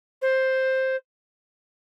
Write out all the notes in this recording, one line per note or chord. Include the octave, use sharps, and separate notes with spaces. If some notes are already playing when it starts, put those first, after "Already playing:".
C5